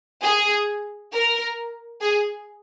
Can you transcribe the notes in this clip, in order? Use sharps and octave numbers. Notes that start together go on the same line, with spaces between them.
G#4
A#4
G#4